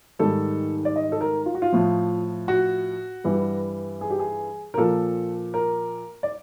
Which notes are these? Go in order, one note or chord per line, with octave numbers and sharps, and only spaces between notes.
G#2 D#3 G3 A4
D5
D#5
A4
A#4
F4
F#4
F4
A2 F3
F#4
G2 E3 G3
G#4
G4
G#4
A#4
A#2 F3 A4
A#4
D5